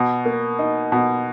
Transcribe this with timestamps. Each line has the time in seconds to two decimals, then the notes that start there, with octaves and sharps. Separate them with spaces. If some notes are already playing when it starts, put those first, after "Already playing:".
Already playing: B2
0.25 A#3
0.59 D#4
0.92 B2